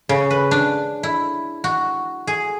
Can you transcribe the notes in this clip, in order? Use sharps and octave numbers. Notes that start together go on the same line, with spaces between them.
C#3
B4
D4
E4
F#4
G#4